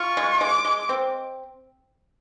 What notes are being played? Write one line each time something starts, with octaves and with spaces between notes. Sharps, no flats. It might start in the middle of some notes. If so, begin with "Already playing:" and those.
Already playing: F4 C#6
G#3
G#3 D6
G#3
C4